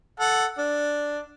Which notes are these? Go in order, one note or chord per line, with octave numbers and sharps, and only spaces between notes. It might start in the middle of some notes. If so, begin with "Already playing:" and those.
A4 F#5
D4